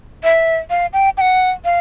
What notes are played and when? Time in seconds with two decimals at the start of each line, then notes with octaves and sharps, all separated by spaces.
0.23 E5
0.70 F5
0.93 G5
1.17 G5
1.21 F#5
1.65 F5